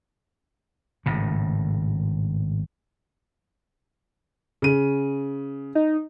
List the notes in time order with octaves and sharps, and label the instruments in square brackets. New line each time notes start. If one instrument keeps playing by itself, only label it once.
[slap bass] G#1 A2 C#3
[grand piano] C#3 D#7
[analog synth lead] D#4